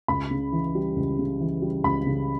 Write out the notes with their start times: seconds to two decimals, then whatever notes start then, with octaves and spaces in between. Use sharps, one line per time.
0.08 C#2 B5
0.31 C#3
0.52 E3
0.75 G3
0.96 C#2
1.19 C#3
1.40 E3
1.62 G3
1.84 C#2 B5
2.07 C#3